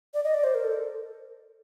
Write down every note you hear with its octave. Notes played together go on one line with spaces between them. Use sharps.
D5
D#5
D5
C5
A#4
A4